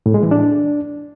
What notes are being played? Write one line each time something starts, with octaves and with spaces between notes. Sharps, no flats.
A2
G#3
E3
D4